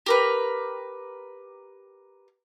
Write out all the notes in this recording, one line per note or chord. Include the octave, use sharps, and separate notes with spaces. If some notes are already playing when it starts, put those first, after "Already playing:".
G4 A#4 B4